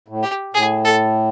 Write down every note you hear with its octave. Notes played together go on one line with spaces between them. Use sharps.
A2
G4
A2 G#4
A4